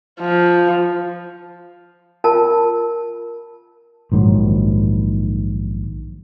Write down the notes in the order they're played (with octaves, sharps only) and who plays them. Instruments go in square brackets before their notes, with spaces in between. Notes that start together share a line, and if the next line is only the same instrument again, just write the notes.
[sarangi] F3
[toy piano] F4 A#4 A5
[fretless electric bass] A#1 G#2 D#3 F#3